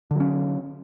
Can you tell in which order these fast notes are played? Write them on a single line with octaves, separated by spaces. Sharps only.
D3 F#3 C#4